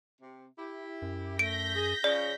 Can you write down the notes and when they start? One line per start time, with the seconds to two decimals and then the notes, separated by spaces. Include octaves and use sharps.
0.21 C3
0.59 E4 G4
1.02 F#2
1.39 A3 G6 A#6 B6 D7
1.76 G#4
2.04 C#3 F3 D5